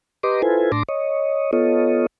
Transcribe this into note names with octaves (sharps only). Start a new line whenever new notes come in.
G4 B4 D#5 A#5 C6 D6
E4 F4 A4 B4 C5 G#5
A2 D4 A5 C6 D6 A#6
C#5 D#5
B3 F4 A4 C#5 D#5